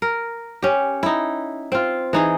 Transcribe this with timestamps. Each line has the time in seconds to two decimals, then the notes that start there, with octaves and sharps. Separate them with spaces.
0.02 A#4
0.62 C#4 G4
1.03 D#4 E4
1.72 C4 F4
2.13 E3 D#4 G#4